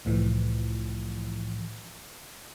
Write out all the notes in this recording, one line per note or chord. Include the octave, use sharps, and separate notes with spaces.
C2 A2 E3 F3